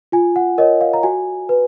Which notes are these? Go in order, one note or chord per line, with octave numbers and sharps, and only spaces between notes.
F4 G#5
F#5
A#4 C#5 D#5
F5
A#5
F#4 G#5
B4